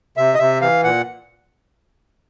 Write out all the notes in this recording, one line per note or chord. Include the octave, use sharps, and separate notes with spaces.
C3 E5
D#5
C3 E5
E3 F5
A#2 F#5